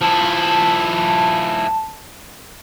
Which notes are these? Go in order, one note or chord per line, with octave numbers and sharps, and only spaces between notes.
F3 E4 A5